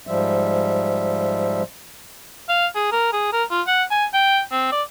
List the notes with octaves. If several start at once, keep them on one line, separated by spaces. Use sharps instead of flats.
G#2 F3 G3 E5
F5
G#4
A#4
G#4
A#4
F4
F#5
G#5
G5
C4
D5